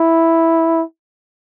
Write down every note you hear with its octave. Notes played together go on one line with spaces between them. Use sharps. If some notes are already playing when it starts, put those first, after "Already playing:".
Already playing: E4